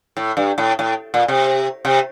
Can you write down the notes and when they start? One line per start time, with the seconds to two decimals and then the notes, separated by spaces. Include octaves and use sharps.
0.17 A2
0.37 G2
0.58 A2
0.79 A2
1.14 A#2
1.28 C3
1.85 C3